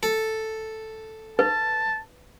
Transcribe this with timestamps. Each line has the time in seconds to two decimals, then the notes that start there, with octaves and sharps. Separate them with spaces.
0.03 A4
1.39 B4 A5